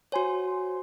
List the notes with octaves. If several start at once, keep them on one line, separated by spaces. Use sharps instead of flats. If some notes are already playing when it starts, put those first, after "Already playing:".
F#4 C5 C#5 G#5 C6